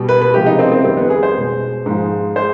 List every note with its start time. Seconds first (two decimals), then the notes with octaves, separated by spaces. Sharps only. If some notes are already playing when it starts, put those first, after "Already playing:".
Already playing: B2 G3
0.09 B4
0.21 B4
0.34 C3 F3 G#3 G4
0.46 D#4
0.59 C4
0.72 C4
0.84 F2 D#3 G3 C4
0.97 B3
1.05 B4
1.10 G#4
1.23 C5
1.35 B2 G#3
1.86 G#2 F3 G#3
2.36 G#3 C5